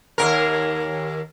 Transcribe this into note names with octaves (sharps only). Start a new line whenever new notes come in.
D#2 C3 A#4